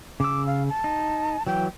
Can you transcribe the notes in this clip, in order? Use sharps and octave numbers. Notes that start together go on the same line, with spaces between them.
C#3 D6 E6
F5
A5
D#4
E3 F#3 G5